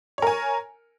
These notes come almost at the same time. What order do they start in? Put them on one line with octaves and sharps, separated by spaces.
C#5 A#4 G#5